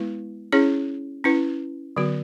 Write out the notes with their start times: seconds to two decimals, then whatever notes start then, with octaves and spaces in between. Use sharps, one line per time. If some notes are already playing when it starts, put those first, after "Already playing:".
Already playing: G#3 B3 E4 B4
0.52 C#4 E4 G#4 C#5
1.24 C#4 E4 B4
1.96 D3 F#3 B3 F#4